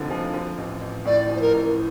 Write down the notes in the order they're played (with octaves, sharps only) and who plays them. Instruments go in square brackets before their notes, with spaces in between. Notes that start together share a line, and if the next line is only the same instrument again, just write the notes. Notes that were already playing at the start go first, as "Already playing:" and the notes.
Already playing: [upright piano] F1 D#2 D3 F3
F3
F3
A1
A1
[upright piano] A2 [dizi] D5
[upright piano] F3
[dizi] C5
A#4
[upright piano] A1